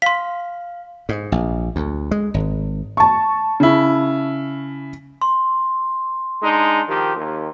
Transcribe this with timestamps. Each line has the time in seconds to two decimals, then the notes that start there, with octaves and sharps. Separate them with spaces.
0.02 F5 C6 B6
1.09 G#2
1.32 A#1
1.76 D2
2.11 G#3
2.34 G#1
2.97 A5 C#6
3.60 C#3 E4
5.22 C6
6.42 G#3 D4 D#4
6.87 D#3 F3 G4
7.17 D#2